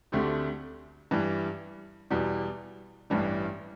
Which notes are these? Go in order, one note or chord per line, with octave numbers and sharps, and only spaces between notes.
D2 D3 A3 C4 G4
G2 E3 G3
E2 B2 G3
A1 G2 E3 G3